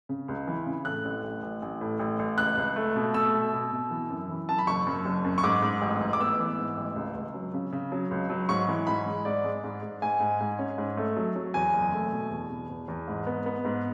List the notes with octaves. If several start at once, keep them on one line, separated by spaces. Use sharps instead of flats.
C#3
C#2
E3
C#3
A2 F#6
A1
A1
A1
A1
A2
A1
A1
C#2 F#6
C#2
A3
B2
A3 E6
B2
B2
B2
E3
F#2
E3
F#2 A5
B5
F#1 C#6
F#2
F#1
F#2
C#6
G#2 D6
G#2
A1
A1
D6
B3 E6
E3
G#2
A1
C#2
C#2
F#3
C#3
C#3
F#3
C#2
F#3
G#2 C#6
E3
G#2 B5
G#3
G#2 D5
G#3
G#2
G#2
G#2 G#5
G#2
G#2
C#4
G#2
A3
F#3
F#3
E2 G#5
F#1
A3
B2
E2
B2
E2
E2
G#2
B3
B3
G#2